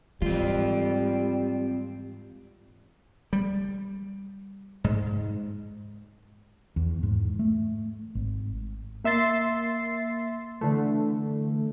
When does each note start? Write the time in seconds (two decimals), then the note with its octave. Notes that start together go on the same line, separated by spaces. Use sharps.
0.22 G#2 E3 G3 C4 F4
3.33 G3
4.84 G#2
6.76 E2
7.03 G#2
7.39 A3
8.15 G#1
9.04 A#3 E5 C6 A6 C7
10.61 D3 E3 A3